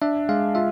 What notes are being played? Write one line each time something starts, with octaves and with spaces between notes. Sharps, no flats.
D4 E5
G#3 F5
F4 E5